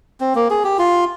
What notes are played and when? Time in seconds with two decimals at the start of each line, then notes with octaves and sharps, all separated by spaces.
0.20 C4
0.35 A#3
0.50 G#4
0.64 G4
0.79 F4